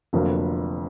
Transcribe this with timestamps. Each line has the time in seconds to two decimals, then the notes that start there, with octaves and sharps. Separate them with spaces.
0.13 F1 F2 D3 F#3 A#3